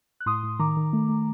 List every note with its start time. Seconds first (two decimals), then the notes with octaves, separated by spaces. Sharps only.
0.20 F#6
0.26 A2 C6 D#6
0.43 A2
0.59 D#3 A#5 D6
0.77 D#3
0.93 A3
1.09 A3